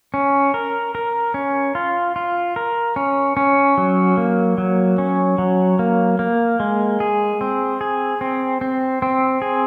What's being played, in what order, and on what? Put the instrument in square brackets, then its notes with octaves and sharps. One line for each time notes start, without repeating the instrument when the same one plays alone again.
[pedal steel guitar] C#4
A#4
A#4
C#4
F4
F4
A#4
C#4
C#4
F#3
A#3
F#3
C#4
F#3
A#3
A#3
G#3
G#4
C4
G#4
C4
C4
C4
G#4